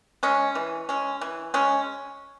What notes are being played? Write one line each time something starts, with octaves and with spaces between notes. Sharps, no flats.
G#3 C#4
E3
G#3 C#4
E3
G#3 C#4